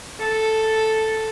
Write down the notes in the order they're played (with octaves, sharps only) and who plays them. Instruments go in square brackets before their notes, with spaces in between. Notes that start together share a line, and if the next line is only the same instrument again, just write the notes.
[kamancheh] A4